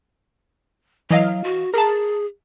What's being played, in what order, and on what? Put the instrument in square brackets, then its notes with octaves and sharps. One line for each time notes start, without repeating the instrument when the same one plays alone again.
[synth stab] E3 D#5 F5 [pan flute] F#3
[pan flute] F#4
[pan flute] G#4 [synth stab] A#4 A5